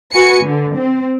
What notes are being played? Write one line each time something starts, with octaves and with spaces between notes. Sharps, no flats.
F#4 B4 G#5 C#7
D3
C4